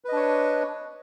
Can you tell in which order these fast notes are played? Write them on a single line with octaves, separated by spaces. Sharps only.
B4 D#5 D4 C#5